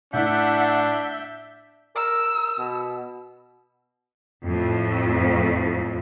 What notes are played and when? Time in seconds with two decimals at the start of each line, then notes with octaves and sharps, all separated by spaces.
0.13 A2 D4 E4 E5 F#5 G6
1.96 A#4 E6
2.59 B2
4.44 F2 A2